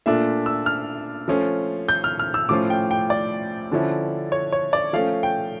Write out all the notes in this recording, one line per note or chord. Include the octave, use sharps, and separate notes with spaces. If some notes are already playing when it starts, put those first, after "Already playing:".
A#2 A3 D4 F4 E5
E6
F6
F3 A3 C#4 F4
G6
F6
F6
E6
A2 F3 C#4 F4 D6
G5
G5
D5
D3 F3 C#4 E4
C#5
C#5
D5
F3 A3 C#4 F5
G5